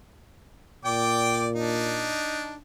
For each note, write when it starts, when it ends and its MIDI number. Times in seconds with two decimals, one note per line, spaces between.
0.85 2.18 46
0.85 1.47 74
0.85 1.47 79
0.85 1.47 86
1.55 2.58 62
1.55 2.58 63